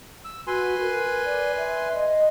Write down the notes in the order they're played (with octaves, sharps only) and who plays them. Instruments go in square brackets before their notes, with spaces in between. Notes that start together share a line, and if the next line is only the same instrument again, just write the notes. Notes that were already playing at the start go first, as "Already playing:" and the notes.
[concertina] E6
[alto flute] F#4 [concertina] B4 G#5 C6
[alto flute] A#4
D5
E5
D#5